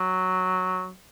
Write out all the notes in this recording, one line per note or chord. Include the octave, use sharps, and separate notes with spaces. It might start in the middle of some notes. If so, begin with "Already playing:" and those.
Already playing: F#3